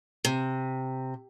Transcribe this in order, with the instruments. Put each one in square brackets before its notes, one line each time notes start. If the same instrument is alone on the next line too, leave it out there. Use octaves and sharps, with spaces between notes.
[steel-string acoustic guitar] C3